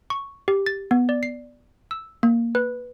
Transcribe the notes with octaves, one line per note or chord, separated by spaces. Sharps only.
C#6
G4
A6
B3
D5
C7
E6
A#3
B4